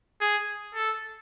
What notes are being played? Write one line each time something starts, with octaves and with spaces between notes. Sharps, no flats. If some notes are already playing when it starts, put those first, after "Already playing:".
G#4
A4